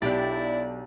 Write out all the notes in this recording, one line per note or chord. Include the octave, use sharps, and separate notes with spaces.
B1 D4 E4 G4 D5 G6